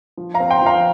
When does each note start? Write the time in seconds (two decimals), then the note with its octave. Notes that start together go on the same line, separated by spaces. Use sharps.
0.17 F3
0.34 F5 A#5
0.40 C4
0.50 G5 C6
0.62 F3 F5 A#5